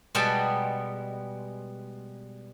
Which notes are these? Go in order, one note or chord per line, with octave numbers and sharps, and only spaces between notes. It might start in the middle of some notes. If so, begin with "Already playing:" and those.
B2 G3 G#3 B3 G5 A5